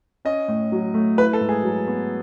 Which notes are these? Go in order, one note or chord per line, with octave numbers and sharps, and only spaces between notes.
C#4 D#5
A2
F#3
A3
E4 B4
A4
G#2
G#4
F#3
B3